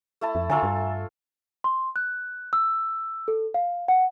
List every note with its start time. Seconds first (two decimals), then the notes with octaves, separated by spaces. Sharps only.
0.21 A3 E4 A5
0.35 F2
0.50 D3 F4 A4 C#5 G#5 A#5 E6
0.63 G2
1.64 C6
1.96 F#6
2.53 E6
3.28 A4
3.54 F5
3.88 F#5